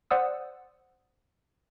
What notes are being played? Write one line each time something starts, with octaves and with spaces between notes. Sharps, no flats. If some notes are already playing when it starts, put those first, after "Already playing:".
C5 D5 F#5 D#6 E6